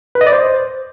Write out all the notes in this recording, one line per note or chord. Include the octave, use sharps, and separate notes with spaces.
B4
D#5
D5
C5